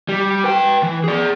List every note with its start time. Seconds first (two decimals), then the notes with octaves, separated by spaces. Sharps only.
0.09 G3
0.44 B4 G5
0.83 E3
1.04 G#4 D5